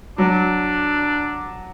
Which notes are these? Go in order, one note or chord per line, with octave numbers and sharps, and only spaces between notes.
F#3 D4